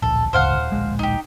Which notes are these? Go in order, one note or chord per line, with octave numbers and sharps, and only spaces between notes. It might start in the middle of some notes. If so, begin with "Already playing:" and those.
D1 A#1 A4
D1 G1 C#2 C5 F5 F#5
D#1
D1 A#1 G#3
D#4 G4